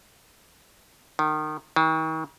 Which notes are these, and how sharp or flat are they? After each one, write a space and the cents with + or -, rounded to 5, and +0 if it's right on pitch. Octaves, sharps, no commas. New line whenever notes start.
D#3 -25
D#3 +40